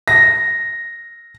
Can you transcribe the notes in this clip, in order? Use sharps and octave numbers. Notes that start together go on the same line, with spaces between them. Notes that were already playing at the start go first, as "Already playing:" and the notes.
A#6